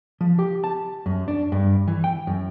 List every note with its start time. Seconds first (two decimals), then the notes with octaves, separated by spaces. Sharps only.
0.21 F3
0.39 G4
0.64 A5
1.06 F#2
1.28 D4
1.52 G2
1.88 E3
2.04 G5
2.27 F#2